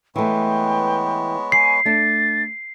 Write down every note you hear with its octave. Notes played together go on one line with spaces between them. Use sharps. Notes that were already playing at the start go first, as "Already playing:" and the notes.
E3 G#3 A3 B3 C#5 G5
G#5 C7
A3 D4 A6